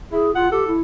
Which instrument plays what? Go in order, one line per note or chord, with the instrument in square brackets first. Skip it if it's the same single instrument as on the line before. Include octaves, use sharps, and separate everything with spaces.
[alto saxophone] E4 [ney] G#4
[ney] F4 [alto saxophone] F#5
[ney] G4 [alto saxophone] A4
[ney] E4